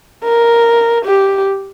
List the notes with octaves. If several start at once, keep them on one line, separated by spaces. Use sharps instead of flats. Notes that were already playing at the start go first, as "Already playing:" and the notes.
A#4
G4